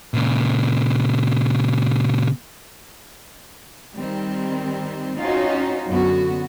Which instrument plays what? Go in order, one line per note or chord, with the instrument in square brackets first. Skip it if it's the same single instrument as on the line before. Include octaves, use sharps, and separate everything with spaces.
[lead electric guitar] A#2 C#3
[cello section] D#3 G3 C4
C4 C#4 D#4 F4 F#4
F#2 D3 B3 F#4